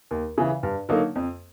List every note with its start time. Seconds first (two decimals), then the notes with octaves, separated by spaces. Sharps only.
0.11 D#2
0.38 C#3 E3
0.63 G2
0.89 D3 F#3 A#3 D#4
1.15 F2